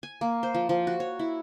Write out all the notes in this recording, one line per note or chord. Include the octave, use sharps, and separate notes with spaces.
G#5
A#3
C5
F3
F3
F#4
C#5
E4